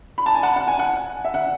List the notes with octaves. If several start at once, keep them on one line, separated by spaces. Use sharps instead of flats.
B5
A5
G#5
F#5 A5
F#5
G#5
F#5
E5
F#5